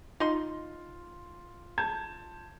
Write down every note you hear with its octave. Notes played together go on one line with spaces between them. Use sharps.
D#4 F4 C6
A5 G6 G#6